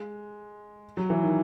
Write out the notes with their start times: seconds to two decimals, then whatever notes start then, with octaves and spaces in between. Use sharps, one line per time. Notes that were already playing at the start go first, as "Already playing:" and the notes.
Already playing: G#3
0.97 F#3
1.10 E3
1.23 D#3